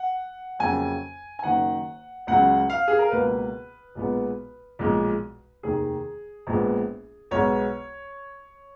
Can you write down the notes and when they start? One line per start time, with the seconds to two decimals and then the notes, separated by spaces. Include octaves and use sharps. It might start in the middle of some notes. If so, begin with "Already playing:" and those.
Already playing: F#5
0.59 F2 C#3 F#3 A#3 G#5
1.39 G#5
1.43 F#1 F#2 D#3 F#5
2.27 C#2 C#3 F#3 F#5
2.70 F5
2.88 G#4
2.99 A#4
3.11 C#2 B2 A#3 B4
3.95 B1 A#2 G#3 B3
4.79 B1 A#2 F3 G#3
5.63 F1 D#2 D#3 G#4
6.47 A#1 A#2 G#3 B3
7.31 B1 B2 G#3 B3 C#5